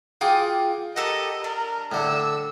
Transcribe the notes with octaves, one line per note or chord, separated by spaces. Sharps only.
F4 F#4 G#4 G5 D6
G4 A4 A#4 D#5 F#5
D4 A#4
A2 D3 E6